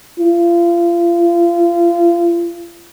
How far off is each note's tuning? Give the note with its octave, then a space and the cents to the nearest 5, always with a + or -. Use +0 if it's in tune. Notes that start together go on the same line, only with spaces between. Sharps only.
F4 -30